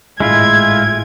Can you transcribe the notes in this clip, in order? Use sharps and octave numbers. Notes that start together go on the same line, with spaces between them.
G#1 A2 G#3 E4 F4 G#6